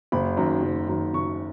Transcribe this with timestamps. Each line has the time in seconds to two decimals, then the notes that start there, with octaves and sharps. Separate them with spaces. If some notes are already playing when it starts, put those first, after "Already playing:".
0.12 F#1 B5
0.37 F#2 D#3
0.62 F#1
0.88 F#2 D#3
1.14 F#1 C#6